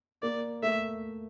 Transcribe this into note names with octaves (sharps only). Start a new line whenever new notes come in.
A#3 D5
A3 E5